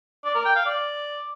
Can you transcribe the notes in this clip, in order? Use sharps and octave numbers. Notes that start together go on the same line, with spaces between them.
D5
A#4
G5
F5
D5